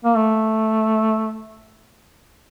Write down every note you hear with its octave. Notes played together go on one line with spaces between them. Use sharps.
A#3
A3